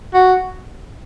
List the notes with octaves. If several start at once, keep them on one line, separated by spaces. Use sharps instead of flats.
F#4